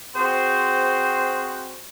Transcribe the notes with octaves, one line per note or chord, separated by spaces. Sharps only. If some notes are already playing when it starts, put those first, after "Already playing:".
C4 F#4 G#4 C5